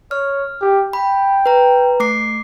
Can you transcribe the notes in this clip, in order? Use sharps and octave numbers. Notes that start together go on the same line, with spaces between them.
C#5 F6
G4
G5 B5
B4 A#5
A3 D6 C7